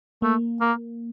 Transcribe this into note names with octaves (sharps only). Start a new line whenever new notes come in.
A3 A#3
A#3